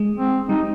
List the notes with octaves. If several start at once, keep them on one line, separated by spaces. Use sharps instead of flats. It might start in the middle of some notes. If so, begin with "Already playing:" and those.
Already playing: G#3
C4
G3 D#4